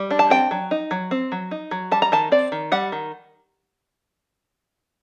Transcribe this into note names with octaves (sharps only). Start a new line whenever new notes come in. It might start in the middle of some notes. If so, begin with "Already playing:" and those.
Already playing: G3
D4
A5
C4 G5
F#3
D#4
F#3
C4
F#3
D#4
F#3
G3 A5
A#5
D#3 A5
C4 D5
D#3
G3 F#5
D#3